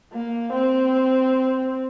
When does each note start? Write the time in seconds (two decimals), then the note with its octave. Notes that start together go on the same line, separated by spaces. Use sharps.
0.13 A#3
0.53 C4